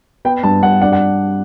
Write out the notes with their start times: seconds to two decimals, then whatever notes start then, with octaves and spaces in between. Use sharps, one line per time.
0.25 B3 G5
0.43 G2 A5
0.62 G2 F#5
0.81 D4 F#5
0.92 F#5